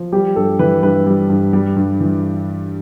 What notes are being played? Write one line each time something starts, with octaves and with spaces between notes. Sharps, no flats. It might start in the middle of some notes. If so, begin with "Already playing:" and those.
Already playing: F3
G3 G4
G2 A4
E3 B4
G2 B4
G3
G2
G3
G2
E3